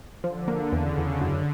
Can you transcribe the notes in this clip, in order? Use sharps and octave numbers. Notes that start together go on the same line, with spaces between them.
D3 F3
A#3
E2 C#3
E2
F#2 D3